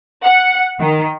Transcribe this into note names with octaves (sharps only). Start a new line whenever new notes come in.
F#5
D#3